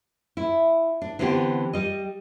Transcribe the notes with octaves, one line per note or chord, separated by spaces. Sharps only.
E4
D4
D3 E3 B3 C4 F4 G4
G3 D#5